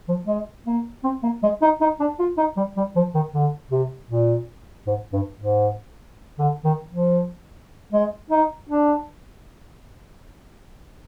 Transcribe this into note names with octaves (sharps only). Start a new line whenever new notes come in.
F3
G#3
A#3
C4
A#3
G#3
D#4
D#4
D4
F4
D#4
G3
G3
F3
D#3
D3
C3
A#2
G#2
G2
G#2
D3
D#3
F3
G#3
D#4
D4